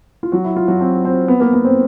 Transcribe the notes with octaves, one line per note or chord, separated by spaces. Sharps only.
F4
F#3 F#4
E4
F4
F#3 F#4
C4 C5
C4 C5
B3 B4
A#3 A#4
B3 B4
C4 C5